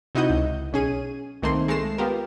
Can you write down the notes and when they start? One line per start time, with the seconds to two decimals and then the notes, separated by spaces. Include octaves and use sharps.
0.15 C3 D#4 E4 F#4 D#5 G6
0.30 C#2
0.73 B1 C#4 G#4 D#7
1.42 C2 D#3 A3 A#3 C4 C6
1.68 G#3 A3 A#6 C7 E7
1.98 B3 F4 G4 A#4